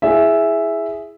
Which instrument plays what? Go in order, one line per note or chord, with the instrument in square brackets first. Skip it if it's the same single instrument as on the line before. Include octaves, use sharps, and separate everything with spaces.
[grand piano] E4 G#4 E5